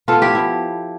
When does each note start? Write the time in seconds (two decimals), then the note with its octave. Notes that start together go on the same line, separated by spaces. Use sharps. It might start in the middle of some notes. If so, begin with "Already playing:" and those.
0.08 B3 F4 A4
0.22 E4 G4
0.35 F3 E4